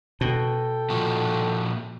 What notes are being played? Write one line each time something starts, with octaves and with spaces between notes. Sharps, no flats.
B2 A4 G5
A#2 F3 F#4